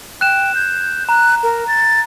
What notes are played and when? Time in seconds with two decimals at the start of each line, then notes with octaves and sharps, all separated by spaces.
0.21 G5 F#6 E7
0.55 G6
1.09 A#5 F#6
1.43 A#4
1.68 A6